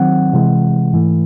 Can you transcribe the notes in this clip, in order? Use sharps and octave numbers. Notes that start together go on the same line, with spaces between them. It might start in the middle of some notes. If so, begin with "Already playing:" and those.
Already playing: D#3 F#3 C4 F#5
C3 E3 G#3
G#2 E3 A3